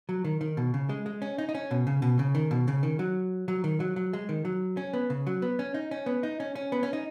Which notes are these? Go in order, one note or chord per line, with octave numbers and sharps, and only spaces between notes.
F#3
D#3
D#3
B2
C#3
G#3
G#3
C#4
D#4
D#4
C#4
B2
C#3
B2
C#3
D#3
B2
C#3
D#3
F#3
F#3
D#3
F#3
F#3
G#3
D#3
F#3
C#4
B3
C#3
F#3
B3
C#4
D#4
C#4
B3
D#4
C#4
C#4
B3
C#4
D#4